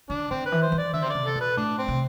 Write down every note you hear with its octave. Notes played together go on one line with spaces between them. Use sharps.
D3 D4
D3 C4
B4
E3
C5
E3
D5
D3 E5
C5
C3 D5
A4
B2
B4
A2 D4
C4
C3